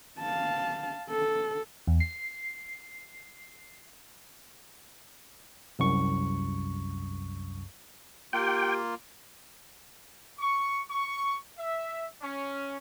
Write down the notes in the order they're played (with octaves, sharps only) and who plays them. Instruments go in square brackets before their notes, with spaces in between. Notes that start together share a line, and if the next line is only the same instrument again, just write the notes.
[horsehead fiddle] F5 A5
A4
[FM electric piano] E2
C7
[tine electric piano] C2 F#2 C#6
[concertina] A#3 F4 [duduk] G4 [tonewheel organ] G5
[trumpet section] C#6
C#6
E5
C#4